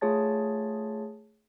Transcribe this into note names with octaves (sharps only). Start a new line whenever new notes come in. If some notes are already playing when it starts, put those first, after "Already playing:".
A3 F4 G#4 C#5 A5 A6